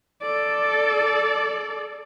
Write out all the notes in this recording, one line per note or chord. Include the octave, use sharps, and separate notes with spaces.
A4 D5